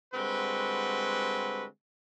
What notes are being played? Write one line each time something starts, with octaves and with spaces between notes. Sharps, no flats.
D3 G3 G#3 C4 F#4 B4